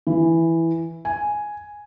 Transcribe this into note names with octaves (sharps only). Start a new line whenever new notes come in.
E3
G#5